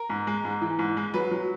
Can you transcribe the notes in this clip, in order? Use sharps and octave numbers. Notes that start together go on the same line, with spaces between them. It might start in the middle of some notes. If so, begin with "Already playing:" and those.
Already playing: A#4
G#2
G#3
G#2
E3
G#2
G#3
F#3 B4
F#3